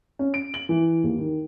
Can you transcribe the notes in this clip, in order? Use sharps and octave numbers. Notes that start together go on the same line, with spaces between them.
C#4
D7
F#7
E3
D#2
D#3